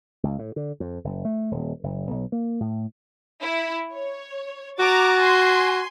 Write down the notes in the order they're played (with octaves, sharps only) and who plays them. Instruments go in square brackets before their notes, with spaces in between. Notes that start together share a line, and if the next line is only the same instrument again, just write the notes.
[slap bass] C#2
A2
D3
F2
F#1
A3
D#1
F#1
B1
A#3
A2
[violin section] E4
C#5
[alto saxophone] F#4 [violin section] A#5 D6 A6
[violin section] G#5 C6